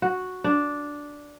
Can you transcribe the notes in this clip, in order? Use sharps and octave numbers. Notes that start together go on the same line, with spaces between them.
F#4
D4